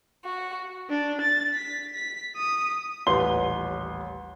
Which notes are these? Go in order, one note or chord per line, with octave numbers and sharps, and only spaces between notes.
F#4
D4
A6
B6
B6
D#6
D#1 A1 B4 C6 G7